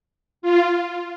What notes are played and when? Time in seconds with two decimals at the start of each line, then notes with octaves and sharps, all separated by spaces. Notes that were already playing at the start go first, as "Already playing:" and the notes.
0.42 F4